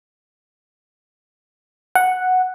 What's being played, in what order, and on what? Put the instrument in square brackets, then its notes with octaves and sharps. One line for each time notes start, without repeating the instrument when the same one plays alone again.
[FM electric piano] F#5